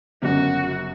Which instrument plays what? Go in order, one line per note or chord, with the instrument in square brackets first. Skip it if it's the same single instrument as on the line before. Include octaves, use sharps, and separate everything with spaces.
[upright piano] G1 F#2 C#3 [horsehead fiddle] F#4